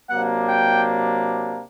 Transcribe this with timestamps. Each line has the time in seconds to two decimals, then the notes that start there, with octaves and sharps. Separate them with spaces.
0.10 C3 F#3 A#3 D4 F#5
0.49 G5